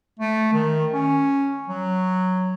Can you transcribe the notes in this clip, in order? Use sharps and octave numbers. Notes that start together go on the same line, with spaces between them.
A3
D#3
C#4
F#3